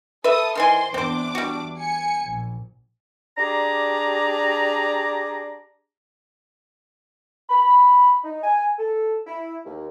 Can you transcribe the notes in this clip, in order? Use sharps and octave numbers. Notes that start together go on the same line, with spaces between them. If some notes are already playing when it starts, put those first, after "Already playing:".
A4 B4 E5 D#6
D#3 E3 C5 G#5 C6
E2 C4 D4 C5 D6
G3 F#4
G#5 C#7
A#1
D4 G4 G#4 D5 A#5
B5
D#4
G#5
A4
E4
D#2